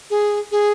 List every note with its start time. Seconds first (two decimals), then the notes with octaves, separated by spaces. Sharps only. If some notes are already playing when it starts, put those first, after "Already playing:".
0.10 G#4
0.51 G#4